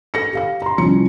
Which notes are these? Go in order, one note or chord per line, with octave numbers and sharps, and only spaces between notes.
A4 A#6 C#7
G4 F5 A#6
A#5 C6
C2 F3 C#4 C#7